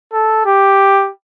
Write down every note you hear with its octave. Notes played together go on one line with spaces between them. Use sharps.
A4
G4